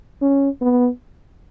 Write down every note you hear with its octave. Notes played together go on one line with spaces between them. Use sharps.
C#4
B3